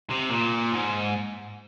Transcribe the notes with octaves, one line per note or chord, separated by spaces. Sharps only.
C3
A#2
G#2